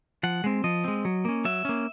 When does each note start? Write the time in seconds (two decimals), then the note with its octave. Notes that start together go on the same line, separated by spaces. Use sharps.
0.23 F3 F#5
0.44 G#3 C4
0.64 F3 D#5
0.84 G#3 C4
1.05 F#3
1.25 A#3 C#4
1.45 F#3 E5
1.65 A#3 C#4